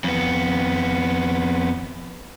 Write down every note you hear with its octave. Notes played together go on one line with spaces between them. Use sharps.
F2 B3